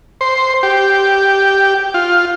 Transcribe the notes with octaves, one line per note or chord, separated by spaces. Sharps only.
C5
G4
F4